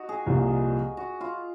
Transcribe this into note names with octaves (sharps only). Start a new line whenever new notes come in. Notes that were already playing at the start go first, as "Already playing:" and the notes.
Already playing: D#4 F#4
G#4
C2 A#2 F3
F#4
F4